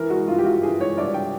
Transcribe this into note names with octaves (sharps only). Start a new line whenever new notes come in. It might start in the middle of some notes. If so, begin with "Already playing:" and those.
Already playing: E3 A#4
G#3 F#4
G2 F4
G4
G2 F#4
E3 G#4
G#3 C#5
G2 D5
G5